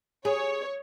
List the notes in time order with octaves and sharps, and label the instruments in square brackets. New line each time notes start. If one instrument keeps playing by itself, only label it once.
[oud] G#4 [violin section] C#5